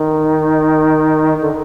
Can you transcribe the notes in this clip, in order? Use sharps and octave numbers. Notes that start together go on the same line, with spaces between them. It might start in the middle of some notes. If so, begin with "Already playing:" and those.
Already playing: D#3
D3